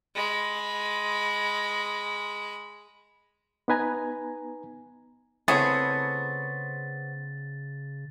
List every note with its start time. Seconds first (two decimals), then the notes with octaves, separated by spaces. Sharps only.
0.15 G#3 B5
3.68 B3 D#4 B4 G#5 A#5
5.48 C#3 A3 B3 C4 E4 G#4 C#5 A6